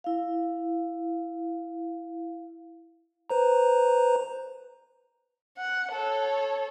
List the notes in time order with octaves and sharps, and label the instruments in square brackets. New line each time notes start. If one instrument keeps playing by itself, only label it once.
[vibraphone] E4 F5
[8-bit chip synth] B4 C5 A#5
[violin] F#5
A4 C#5